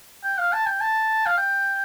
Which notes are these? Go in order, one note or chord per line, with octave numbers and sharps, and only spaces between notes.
G5
F5
A5
G5
A5
F5
G5